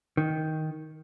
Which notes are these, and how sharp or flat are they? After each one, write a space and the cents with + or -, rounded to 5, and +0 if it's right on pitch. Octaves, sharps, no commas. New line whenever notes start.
D#3 +10